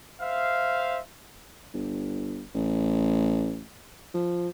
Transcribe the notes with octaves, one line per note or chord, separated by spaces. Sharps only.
C5 E5 F5
G1
A1
F3